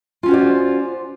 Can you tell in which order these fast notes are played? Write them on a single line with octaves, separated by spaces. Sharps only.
F4 C#4 F#4 C5 D5